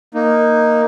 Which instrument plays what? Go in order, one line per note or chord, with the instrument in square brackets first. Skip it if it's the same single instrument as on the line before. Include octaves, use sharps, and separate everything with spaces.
[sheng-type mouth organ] A#3 D#4